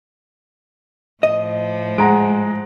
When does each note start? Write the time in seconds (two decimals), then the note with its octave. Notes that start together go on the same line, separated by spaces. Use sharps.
1.23 A2 F3 D#5
1.98 G#3 F#5 A#5 D7